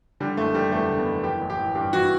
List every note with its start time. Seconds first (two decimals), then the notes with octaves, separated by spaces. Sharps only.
0.20 D3 G3
0.37 F#1 A3
0.55 F#1 G3
0.71 E2 A3
0.89 D3
0.98 B3
1.06 F#1
1.23 E3 G4
1.41 A1
1.50 G4
1.59 A1
1.75 G2 G4
1.93 E3 F#4